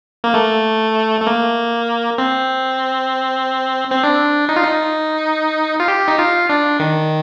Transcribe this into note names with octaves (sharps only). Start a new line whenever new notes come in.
A#3
A3
A3
A#3
C4
C4
D4
D#4
F4
D#4
F4
G4
D#4
F4
D4
D#3